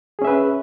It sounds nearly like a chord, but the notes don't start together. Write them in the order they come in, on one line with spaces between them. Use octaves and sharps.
G#4 C#4 E5 B4